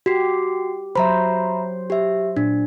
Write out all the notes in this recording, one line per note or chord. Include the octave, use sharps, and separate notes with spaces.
F#4 G4 C7
F#3 C5 E5 A#5 B5
G4 E5
A#2 D4